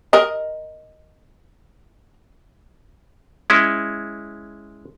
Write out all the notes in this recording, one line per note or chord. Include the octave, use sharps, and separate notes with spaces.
A#4 D#5
G#3 C#4 E4